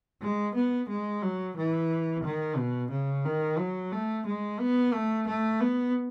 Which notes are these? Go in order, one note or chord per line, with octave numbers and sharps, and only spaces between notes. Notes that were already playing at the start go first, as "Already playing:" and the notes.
G#3
B3
G#3
F#3
E3
D#3
B2
C#3
D#3
F#3
A3
G#3
B3
A3
A3
B3